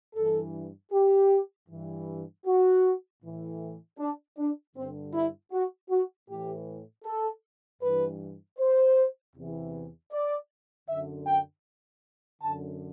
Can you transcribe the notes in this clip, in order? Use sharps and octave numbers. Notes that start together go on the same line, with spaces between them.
G2 E3 A4
G4
G2 E3
F#4
A2 E3
D4
D4
G2 D3 C4
E4
F#4
F#4
A2 E3 G4
A4
G2 E3 B4
C5
E2 C3 E3
D5
F#2 D3 E5
G5
F#2 D3 A5